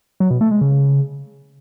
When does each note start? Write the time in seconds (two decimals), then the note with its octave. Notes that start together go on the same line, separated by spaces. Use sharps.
0.20 F#3
0.31 B2
0.41 A3
0.51 G#3
0.61 C#3